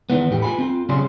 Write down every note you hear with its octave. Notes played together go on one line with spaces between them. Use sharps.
D#3 E3 B3
E2 A2 G4
F4 G#5 B5
C4 F4
B1 C#3 G3 C#4 G#4 C6